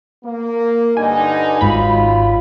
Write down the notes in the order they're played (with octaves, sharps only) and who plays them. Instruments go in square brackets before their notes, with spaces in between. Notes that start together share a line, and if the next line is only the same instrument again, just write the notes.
[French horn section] A#3
[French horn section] G2 D3 D#4 [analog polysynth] G#5
[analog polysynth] G#1 G#2 B5 [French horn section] F#3 F4